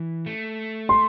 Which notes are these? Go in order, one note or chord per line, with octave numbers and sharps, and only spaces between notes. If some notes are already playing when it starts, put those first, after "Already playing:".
Already playing: E3
A3
C6